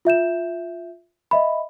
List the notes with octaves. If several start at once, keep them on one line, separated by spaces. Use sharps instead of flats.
F4 E5 G6 E7
D#5 E5 B5